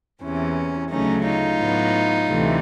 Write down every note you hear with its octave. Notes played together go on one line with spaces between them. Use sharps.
E2 C3 E3 C#4
D2 C#3 F#3 A3 C#4 D#4
D#4 F4
A2 F#3 B3
D2 C3 E3 A3